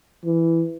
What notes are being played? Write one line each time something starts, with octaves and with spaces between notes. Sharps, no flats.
E3